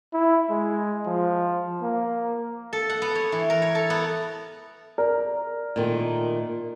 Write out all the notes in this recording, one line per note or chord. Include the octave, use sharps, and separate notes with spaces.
E4
G#3
F3
A#3
A4
F#5
B3
C#5
E3
A#4
C#5
A4
B3
A#4 D5
A#2 D#3 A3